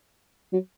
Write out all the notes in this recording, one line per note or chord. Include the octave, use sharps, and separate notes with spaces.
F#3